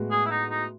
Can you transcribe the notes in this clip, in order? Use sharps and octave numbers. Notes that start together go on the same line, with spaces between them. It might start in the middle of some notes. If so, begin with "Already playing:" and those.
Already playing: A2 G#3 B3 F#4
G#4
E4
D#4
D#4